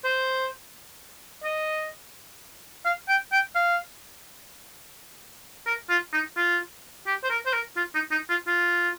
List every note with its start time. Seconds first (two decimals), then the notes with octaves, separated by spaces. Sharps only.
0.04 C5
1.44 D#5
2.85 F5
3.09 G5
3.32 G5
3.55 F5
5.66 A#4
5.90 F4
6.13 D#4
6.37 F4
7.07 G4
7.24 C5
7.30 A#4
7.46 C5
7.53 A#4
7.77 F4
7.95 D#4
8.11 D#4
8.30 F4
8.47 F4